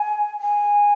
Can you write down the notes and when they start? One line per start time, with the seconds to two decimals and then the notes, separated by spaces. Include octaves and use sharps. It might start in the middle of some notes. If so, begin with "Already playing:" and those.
Already playing: G#5
0.41 G#5